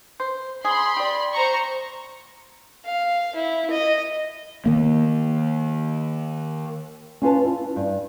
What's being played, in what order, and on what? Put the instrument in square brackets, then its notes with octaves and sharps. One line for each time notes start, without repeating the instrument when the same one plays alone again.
[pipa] C5
[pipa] G#4 [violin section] B5 C6
[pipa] G4 D5
[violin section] C5 A#5 C#6
[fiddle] F5
E4
D#5
[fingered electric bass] D#3 A#3
[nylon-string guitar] C#4 F4 B4 A5
E4 F4
G2